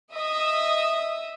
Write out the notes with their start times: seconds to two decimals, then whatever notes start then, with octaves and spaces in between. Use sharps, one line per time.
0.13 D#5 E5 D#6